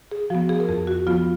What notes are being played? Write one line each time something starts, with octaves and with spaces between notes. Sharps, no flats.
G#4
F3 B3 F#4
G#4
A#4
F2 G#4
F#4
F3 B3 F4